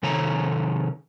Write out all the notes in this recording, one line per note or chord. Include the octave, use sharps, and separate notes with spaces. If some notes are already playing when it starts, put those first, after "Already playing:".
C3 D#3 A4 C#5 A#5